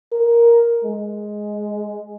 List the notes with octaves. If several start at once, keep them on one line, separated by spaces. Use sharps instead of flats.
A#4
G#3